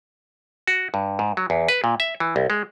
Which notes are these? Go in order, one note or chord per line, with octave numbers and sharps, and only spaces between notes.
F#4
G2
G#2
F#3
E2
B4
A#2
E5
E3
C2
G#3